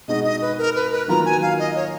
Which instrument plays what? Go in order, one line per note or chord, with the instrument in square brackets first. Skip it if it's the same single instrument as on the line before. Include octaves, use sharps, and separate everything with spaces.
[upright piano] B2 G#3 D#4 F#4 [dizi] D#5
[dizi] D#5
B4
A#4
B4
B4
[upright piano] D#3 F#3 A#3 F4 [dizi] A#5
[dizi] G#5
F5
D#5
C#5